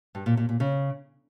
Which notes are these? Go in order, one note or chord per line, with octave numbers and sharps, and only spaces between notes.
G2
A#2
A#2
A#2
C#3